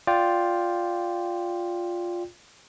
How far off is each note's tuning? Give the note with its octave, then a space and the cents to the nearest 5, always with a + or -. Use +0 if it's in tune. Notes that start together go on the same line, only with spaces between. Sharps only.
F4 +5 D5 +0 G5 +0